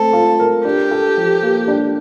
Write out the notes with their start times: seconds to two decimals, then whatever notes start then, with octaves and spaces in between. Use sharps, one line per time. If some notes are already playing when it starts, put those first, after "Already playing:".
Already playing: A3 C4 A4
0.13 F4
0.40 A#4
0.65 D4 G4
0.91 A4
1.17 F3
1.43 A#3
1.68 D4